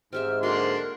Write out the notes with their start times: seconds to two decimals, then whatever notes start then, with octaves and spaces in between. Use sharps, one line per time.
0.13 G#2 C4 G4 E5 F6
0.43 D3 A#3 D4 F#4 A#4 C6